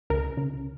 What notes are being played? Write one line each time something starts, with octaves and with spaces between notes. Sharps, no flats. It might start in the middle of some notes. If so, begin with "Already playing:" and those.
C#2 A#4
C#3